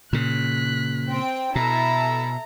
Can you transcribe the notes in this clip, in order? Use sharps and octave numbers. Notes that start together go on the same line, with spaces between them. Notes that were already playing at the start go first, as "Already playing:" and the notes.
A#2 C#3 F#6 B6
C4 G5
B2 E4 A4 A#5